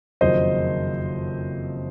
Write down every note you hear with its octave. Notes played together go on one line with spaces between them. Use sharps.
F#1 F2 D#3 F#3 C5 D#5